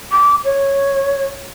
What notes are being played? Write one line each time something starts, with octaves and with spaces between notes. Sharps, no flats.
D6
C#5